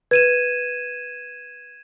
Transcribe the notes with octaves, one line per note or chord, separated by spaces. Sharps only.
B4 G#6 D#7 E7